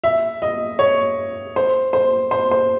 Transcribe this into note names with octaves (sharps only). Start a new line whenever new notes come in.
E5
D#5
C#5
C5
C5
C5
C5